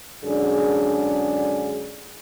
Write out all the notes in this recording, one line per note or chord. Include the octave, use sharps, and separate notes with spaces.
F#2 D3 G#3 D4 G#4